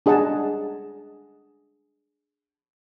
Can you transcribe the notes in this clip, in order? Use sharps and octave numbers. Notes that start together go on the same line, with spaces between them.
D4 G#4 D#5 F#5 A5